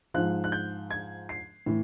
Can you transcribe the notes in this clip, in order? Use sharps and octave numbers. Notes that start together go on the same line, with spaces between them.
G#2 F3 F#6
F#6
G6
G#6
C7
A2 E3